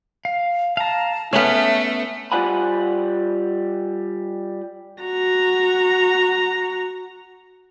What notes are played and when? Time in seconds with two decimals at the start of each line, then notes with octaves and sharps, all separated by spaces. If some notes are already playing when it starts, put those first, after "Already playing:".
0.25 F5
0.77 F5 A5 A#5
1.33 A3 B3 C#4 E5 F6
2.32 G3 F4 C5 F#5 G#5 B5
5.02 F#4 A#5